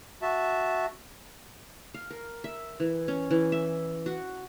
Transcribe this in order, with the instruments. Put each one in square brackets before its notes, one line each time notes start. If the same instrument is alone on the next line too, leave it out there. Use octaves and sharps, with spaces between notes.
[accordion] F#4 E5 A5
[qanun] F5
A#4
E5
E3
C#4
E3
E5
F#4